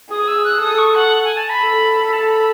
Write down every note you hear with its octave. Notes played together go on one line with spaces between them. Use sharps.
G#4 D#6
E6
F#6
A4 D#6
C#6
F#5
G#5
A5
B5
A4
A4 A5
B5